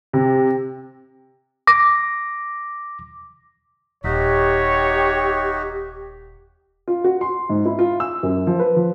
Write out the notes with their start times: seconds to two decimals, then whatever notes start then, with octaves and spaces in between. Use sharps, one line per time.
0.13 C3
1.67 D6 A#6
4.04 D#1 D#4 F#4 G4 C#5 E5
6.88 F4
7.04 F#4
7.21 C6
7.50 G#2
7.65 E4
7.79 F4
8.00 E6
8.23 F#2
8.47 F3
8.59 B4
8.76 F3